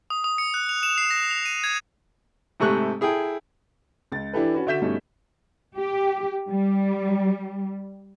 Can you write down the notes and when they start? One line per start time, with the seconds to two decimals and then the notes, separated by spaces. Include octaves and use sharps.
0.10 D#6
0.24 D#6
0.38 C#7
0.54 F#6
0.69 F7
0.83 E7
0.98 C7
1.11 A#6
1.31 F7
1.46 D#7
1.64 G#6
2.60 G#2 C3 A3 C#6 F#6
3.01 E4 G#4 A4 G5
4.12 C#2 A6
4.33 E3 D4 E4 G4 A4 B4
4.54 C#4 F#4 B4
4.67 D3 F#4 E5 G6 B6 E7
4.82 G2 B2 A3 C#4 D#4
5.78 G4
6.50 G3